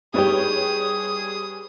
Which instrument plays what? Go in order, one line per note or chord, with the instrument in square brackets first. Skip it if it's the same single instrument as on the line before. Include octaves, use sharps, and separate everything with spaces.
[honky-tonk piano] G3 B4 C#5 [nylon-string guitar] D#4 G4 [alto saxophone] G#4 [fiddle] D#6